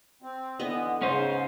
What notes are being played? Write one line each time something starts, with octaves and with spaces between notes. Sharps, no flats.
C4
D3 E3 B3 D#5
G#2 C#3 C#4 D#4 C5